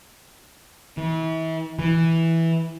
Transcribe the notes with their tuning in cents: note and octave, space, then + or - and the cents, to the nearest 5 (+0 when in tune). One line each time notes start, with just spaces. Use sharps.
E3 -35
E3 -5